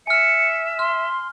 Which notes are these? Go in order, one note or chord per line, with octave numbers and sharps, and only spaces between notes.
E5 G#5 F6 C#7
C6 F6